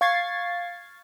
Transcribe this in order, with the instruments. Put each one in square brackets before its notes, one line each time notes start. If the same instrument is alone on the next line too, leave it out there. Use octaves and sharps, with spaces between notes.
[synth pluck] F5 C#6 G#6 A6 C7